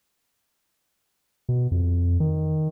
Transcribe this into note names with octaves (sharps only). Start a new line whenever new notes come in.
B2
F2
D#3